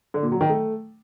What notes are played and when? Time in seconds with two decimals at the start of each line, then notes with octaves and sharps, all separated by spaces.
0.14 D3
0.23 A#2
0.32 F#3
0.41 D#3
0.49 A3